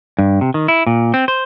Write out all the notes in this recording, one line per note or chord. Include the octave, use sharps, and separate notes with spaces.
G2
C3
D#3
E4
A#2
C4
C5